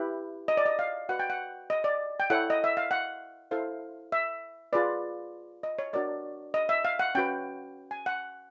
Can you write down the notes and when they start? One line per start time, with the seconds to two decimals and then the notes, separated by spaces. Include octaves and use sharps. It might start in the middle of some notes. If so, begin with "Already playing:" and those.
Already playing: E4 G4 B4
0.48 D#5
0.57 D5
0.66 D#5
0.79 F5
1.09 F#4 B4 F#5
1.19 G5
1.30 F#5
1.70 D#5
1.84 D5
2.20 G5
2.30 E4 A4 C#5 F#5
2.50 D#5
2.64 E5
2.77 F5
2.91 F#5
3.51 E4 A4 C5 F5
4.12 E5
4.73 F4 G#4 B4 D5
5.63 D#5
5.79 C#5
5.93 D4 F#4 A#4 C#5 D5
6.54 D#5
6.69 E5
6.85 F5
6.99 F#5
7.15 C#4 F#4 B4 G5
7.91 G#5
8.06 F#5